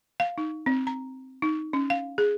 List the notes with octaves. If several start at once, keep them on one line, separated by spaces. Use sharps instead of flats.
F5
D#4
C4
A#5
D#4
C#4
F5
G#4